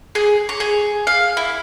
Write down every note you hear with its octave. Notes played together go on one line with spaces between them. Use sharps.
G#4
C#5
G#4
F5
E4